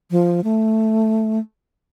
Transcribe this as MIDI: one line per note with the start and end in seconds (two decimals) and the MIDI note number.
0.11 0.41 53
0.44 1.39 57